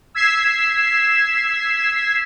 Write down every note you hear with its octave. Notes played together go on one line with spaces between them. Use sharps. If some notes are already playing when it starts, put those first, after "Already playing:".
E6 G#6 B6 C7 E7